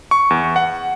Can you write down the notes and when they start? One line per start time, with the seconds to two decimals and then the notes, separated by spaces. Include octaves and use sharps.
0.11 C#6
0.30 E2
0.56 F#5